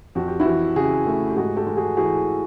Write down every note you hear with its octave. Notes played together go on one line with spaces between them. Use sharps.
F2 F#4
G4
E4 F#4
E3
C#3 F#4 G#4
A3
G4
G#2 F#4 G#4
G4 A4
G#3
F#4 G#4
E3 F#4 G#4